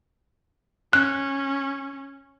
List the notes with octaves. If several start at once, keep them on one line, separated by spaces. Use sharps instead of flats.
C#4 F#6